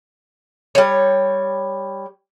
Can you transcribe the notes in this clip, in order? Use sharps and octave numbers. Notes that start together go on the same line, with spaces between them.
G3 C#5